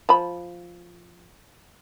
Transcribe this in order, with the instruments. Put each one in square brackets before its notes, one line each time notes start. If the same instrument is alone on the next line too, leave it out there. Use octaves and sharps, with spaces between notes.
[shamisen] F3 B5